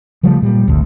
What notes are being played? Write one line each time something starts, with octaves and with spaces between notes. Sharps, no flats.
C#3 F3 G3 A3
A#2 G3
G#1 D2